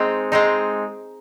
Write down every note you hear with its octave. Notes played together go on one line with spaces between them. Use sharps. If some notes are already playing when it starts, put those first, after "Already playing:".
Already playing: G#3 C4 D#4
G#3 C4 D#4